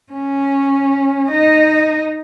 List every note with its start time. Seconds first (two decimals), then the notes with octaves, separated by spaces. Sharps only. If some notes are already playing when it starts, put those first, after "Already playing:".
0.12 C#4
1.30 D#4 D#5